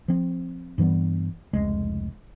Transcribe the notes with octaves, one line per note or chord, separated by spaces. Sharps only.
F3 C4
G2 E3 G3 B3
F1 C#2 G#3